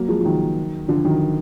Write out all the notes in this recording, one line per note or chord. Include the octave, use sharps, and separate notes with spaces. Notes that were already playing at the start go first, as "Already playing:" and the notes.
Already playing: F#3 A#3
F3 G#3
F3
D#3 F#3
D3 F3
D#3 F#3